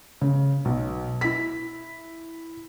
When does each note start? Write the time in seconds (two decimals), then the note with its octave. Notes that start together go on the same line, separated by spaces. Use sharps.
0.21 C#3
0.65 B1
1.21 E4 B6